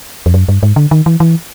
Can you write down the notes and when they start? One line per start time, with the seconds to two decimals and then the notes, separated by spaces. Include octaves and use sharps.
0.26 F2
0.34 F#2
0.48 G2
0.63 G#2
0.76 D3
0.91 D#3
1.06 E3
1.20 E3